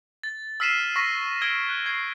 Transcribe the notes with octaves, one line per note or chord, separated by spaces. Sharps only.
A6
E6 F6 B6 C7 D#7 E7
C#6 A#6 B6 D#7
E6 G#6 D7 G7
F#6
G#6 C7